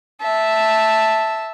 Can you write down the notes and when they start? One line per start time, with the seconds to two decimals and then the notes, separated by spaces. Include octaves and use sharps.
0.21 E5 A5